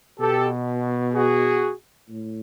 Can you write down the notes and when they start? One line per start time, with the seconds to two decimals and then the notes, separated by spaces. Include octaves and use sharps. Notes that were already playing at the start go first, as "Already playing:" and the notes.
0.19 B2 G4 A4
1.14 F#4 G#4
2.09 A2